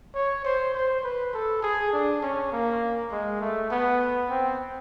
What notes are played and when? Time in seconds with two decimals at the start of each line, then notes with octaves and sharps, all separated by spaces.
0.14 C#5
0.45 C5
0.74 C5
1.03 B4
1.33 A4
1.62 G#4
1.93 D4
2.22 C#4
2.52 A#3
3.11 G#3
3.41 A3
3.71 B3
4.29 C4